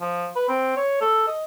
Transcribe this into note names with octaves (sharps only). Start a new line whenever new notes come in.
F3
B4
C4
C#5
A4
D#5